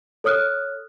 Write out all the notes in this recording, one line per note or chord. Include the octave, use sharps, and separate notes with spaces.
A4 C#5 D#6 F6 F#6